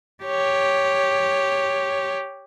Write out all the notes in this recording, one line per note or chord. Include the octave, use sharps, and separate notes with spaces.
G4 C#5